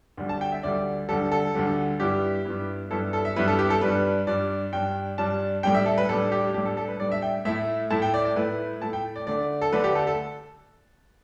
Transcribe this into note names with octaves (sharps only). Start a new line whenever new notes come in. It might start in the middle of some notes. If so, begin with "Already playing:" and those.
D2 D3 G3
A5
G5
E5
D2 D3 G3 D5
D2 D3 G3 A4
A4
D2 D3 G3
G2 G3 B3 E4 G4
G2 G3 B3 E4
G2 G3 B3 E4 A4
A4
E5
G2 G3 B3 E4 B4
A4
G4
A4
G2 G3 D4 B4
G2 G3 D4 D5
G2 G3 D4 G5
G2 G3 D4 A5
A2 G3 D4 G5
E5
A4
B4
A2 G3 D4 A4
G4
A2 G3 D4 G4
A4
A4
B4
A2 G3 D4 D5
E5
G5
A2 A3 E4 E5
A2 A3 E4 A5
G5
D5
D5
A2 A3 E4 B4
A2 A3 E4 A5
G5
D5
D3 A3 D4 D5
A4
D3 A3 D4 B4
G4
A4
A4